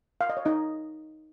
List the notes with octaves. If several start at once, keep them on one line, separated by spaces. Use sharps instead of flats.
F5
D#5
C#5
D#4 D#5